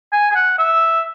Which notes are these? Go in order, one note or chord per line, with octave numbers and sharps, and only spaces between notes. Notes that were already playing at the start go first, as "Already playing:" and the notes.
G#5
G#5
F#5
E5